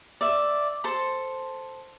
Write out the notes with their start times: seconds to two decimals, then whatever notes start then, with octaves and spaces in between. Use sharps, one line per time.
0.21 D5 E5
0.84 A4 C5 A5 C6